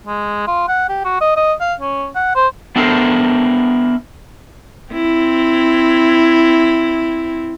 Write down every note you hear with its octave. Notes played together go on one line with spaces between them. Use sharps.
G#3
F4
F#5
G4
F#4
D#5
D#5
F5
C#4
F#5
C5
B3 D4 E4 A4 A#4 C5
C4 E4